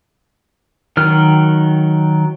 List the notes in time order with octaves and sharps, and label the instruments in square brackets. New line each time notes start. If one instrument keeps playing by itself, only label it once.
[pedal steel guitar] D#3 F#3 F6